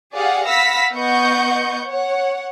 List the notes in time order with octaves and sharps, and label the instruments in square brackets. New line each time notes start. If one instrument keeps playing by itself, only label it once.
[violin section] G4 G#4 D5 F5 F#5
F5 F#5 B5 E6 A#6 B6
B3 D#5 F#5 C#6 G6
C#5 F#5